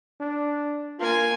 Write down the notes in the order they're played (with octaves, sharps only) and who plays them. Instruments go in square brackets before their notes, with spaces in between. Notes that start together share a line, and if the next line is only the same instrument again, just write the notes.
[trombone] D4
[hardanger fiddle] A#3 G#5 [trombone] F4